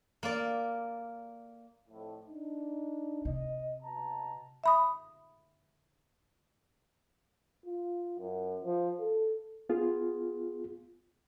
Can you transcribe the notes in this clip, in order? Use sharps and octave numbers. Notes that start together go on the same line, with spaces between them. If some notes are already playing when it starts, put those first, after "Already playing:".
A#3 D5
F2 A2
D4 D#4
C3 D#5
B2 A5 A#5
E5 B5 D#6
F4
F#2
F3
A4
B3 F4 G#4